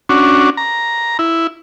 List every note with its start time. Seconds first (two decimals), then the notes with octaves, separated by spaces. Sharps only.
0.09 C#4 D4 F#4
0.57 A#5
1.19 E4